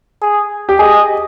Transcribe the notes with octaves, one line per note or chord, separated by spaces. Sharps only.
G#4
G4
G#4 D#5